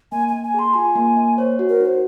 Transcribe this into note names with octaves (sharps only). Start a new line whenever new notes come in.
A#3 G#5
A#3 G#5
G#5
G#4 C6
F4 G#5
A#3
A#3
C5 C#5
F#4
A#4
D#4
C5